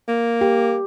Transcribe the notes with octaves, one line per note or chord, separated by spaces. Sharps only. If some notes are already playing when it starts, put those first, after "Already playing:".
A#3
G4